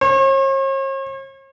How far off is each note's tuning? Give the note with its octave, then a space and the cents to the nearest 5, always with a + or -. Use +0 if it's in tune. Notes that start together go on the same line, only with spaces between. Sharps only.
C#5 -45